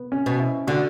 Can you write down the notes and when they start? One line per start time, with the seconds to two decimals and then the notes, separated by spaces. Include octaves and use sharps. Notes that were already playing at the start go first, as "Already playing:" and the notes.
Already playing: B3
0.12 C#4
0.26 B2
0.40 E4
0.67 D3 F#4